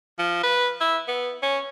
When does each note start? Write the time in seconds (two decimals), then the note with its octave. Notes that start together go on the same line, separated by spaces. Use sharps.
0.19 F3
0.43 B4
0.81 E4
1.08 B3
1.42 C#4